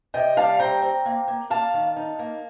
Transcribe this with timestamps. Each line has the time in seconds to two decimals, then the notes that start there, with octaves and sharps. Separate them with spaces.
0.14 C3 D#5 G5
0.37 G3 F5 A5
0.59 C4 G5 A#5
0.82 C4
1.06 A#3
1.28 A#3
1.50 A#3 F5 A5
1.74 D#3
1.96 D#4
2.19 A#3